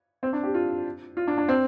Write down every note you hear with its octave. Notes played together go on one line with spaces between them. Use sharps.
C4
D4
G4
F4
F4
D4
D4
C4